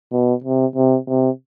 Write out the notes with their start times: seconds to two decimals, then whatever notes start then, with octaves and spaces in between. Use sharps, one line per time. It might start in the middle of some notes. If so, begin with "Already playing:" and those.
0.12 B2
0.44 C3
0.76 C3
1.08 C3